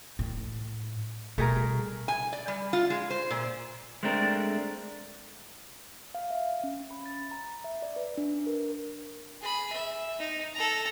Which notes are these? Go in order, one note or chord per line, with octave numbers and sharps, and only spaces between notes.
A2
B2 G3 A3 G#4 A#4
G#5
D5
G3
F4
G#3
C5
A#2
G#3 A3 C4 D4 A#4
F5
E5
C#4
B5
A6
A#5
E5
D5
B4
D4
A#4
G#4 B5
E5
D#4
A4 A#5